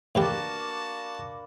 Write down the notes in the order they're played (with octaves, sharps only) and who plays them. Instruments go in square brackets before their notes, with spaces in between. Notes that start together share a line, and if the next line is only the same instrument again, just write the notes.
[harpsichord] A2 E3 G4 [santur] A#3 D4 B4 [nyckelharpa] F#4 A5